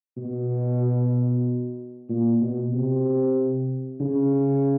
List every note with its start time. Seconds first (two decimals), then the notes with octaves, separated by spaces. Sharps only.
0.17 B2
2.09 A#2
2.41 B2
2.73 C3
4.00 C#3